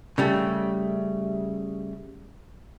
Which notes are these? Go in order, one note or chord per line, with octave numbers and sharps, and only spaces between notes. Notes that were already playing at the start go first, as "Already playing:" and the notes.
C#3 G3 A3